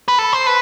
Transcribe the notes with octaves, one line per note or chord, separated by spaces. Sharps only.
B4
A4
C5
B4